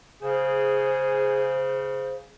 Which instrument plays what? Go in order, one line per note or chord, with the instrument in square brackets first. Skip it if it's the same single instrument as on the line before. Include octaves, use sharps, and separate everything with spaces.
[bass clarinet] C#3 [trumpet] G#4 [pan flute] C5